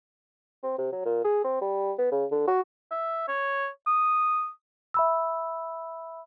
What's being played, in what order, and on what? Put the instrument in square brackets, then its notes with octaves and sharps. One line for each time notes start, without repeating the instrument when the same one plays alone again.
[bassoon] C4
C3
F#3
A#2
G#4
C4
G3
B3
C#3
D3
F#4
[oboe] E5
C#5
D#6
[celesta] E5 B5 E6